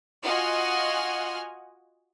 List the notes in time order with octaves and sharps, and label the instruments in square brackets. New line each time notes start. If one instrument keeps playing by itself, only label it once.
[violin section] F4 F#4 D#5 F#5 G#5 F6